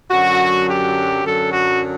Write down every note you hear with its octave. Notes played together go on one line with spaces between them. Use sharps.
F#2 D3 F#3 F#4
G4
F#2 D3 F#3 A4
F#4